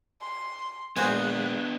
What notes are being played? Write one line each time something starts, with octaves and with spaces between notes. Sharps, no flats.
C6
A#1 G#3 B3 D4 F#4 C5 G#5 F#6